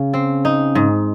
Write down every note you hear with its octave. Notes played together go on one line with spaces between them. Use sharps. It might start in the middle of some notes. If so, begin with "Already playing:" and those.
Already playing: C#3
C4
D#4
G#2